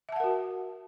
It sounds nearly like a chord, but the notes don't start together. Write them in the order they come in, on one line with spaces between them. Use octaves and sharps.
E5 A5 F#5 A#4 F#4